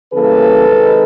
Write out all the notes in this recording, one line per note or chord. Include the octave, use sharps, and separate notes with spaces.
C#3 E3 G3 A#3 A4 B4
C3 D#3 G#3